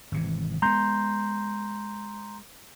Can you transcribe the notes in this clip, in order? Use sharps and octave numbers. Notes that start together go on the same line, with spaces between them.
G#1 C3 E3
G#3 A3 B3 A#5 C6 G6